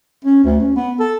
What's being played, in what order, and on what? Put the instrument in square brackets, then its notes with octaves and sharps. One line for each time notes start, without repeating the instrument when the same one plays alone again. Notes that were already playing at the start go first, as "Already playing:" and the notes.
[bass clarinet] C#4
D2
C#4
B3
A4